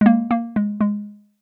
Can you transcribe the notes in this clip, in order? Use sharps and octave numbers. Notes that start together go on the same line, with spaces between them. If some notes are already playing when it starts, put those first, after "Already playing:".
G#3
A#3
A#3
G#3
G#3